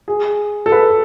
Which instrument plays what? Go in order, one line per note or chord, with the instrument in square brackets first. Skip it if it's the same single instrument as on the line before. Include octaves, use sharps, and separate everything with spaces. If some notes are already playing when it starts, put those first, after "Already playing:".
[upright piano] G#4
A4
B4